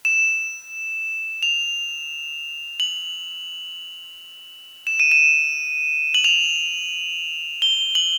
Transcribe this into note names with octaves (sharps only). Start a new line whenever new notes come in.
E7
F7
F#7
E7
D#7
E7
F#7
F7
G7
F#7